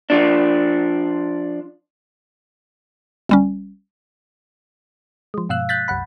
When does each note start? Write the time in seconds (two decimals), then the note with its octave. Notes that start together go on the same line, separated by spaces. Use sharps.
0.10 F3 D4
3.29 G1 G3 C#4
5.34 F3 G#3
5.49 G2 B2 F5 E6 F#6
5.69 F#6 G6 A6 B6
5.88 C2 F#2 F#5 B5